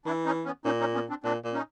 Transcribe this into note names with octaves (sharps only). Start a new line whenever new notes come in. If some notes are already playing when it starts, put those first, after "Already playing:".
E3 D4 E4
C#4 D#4
B3 C#4
A#2 C#4 D#4
C#4 D#4
B3 C#4
C4 D4
A#2 C4 D4
A#2
C#4 D#4